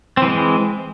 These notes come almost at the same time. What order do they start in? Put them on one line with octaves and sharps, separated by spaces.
C4 E3 G#3